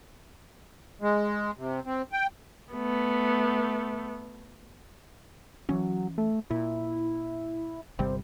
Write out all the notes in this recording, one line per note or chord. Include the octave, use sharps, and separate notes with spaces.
G#3
C3
C4
G5
A3 B3
E3 F#3 C#4
A3
A#2 E4
G1 C3 G3 C4